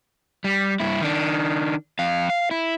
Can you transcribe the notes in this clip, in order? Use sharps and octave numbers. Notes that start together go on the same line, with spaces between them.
G3
G2 E4
D#3 D4
F2 F5
F5
E4